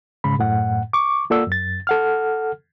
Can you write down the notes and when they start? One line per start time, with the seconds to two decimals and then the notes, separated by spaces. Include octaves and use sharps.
0.24 G#2 C#3 G#3 B5
0.39 F#2 A2 F#5
0.93 C#6 D6
1.30 A#3 F4 A4 D5 F#5 E6
1.47 F#2 A6
1.87 A4 F#5 F6